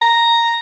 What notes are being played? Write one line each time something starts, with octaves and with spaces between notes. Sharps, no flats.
A#5